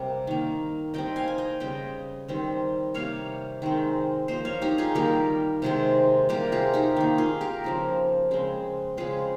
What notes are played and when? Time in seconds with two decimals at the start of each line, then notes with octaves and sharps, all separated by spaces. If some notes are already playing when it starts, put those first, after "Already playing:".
Already playing: C3 G3 A#3
0.27 D#3 A#3
0.94 D#3 G3 C4 D#5 G5
1.16 F5 G#5
1.28 G#5
1.38 D#5 G5
1.60 C#3 G3 C4 D#5 G5
2.28 D#3 G3 C4
2.94 C3 G3 A#3 C#5 F5
3.62 D#3 G#3 C4
4.28 F3 A#3 C5 D#5
4.45 C#5 F5
4.62 D#4 G4
4.78 F4 G#4
4.95 D#3 G3 A#3 G4 A#4
5.62 C3 D#3 G#3 C4
6.29 C3 G3 A#3 G4 A#4
6.52 F4 G#4
6.74 D#4 G4
6.96 D#3 A#3
7.18 F4 G#4
7.41 G4 A#4
7.64 C#3 F3 C4
8.31 C#3 G#3 C4
8.97 C#3 G#3 C4 F4 G#4